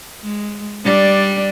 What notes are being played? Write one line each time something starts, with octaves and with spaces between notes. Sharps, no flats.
G#3
G3 D4